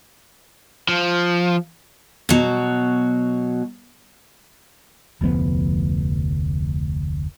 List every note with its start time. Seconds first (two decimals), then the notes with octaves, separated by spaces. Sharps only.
0.88 F3
2.29 B2 F#3
5.21 F1 D2 F3 B3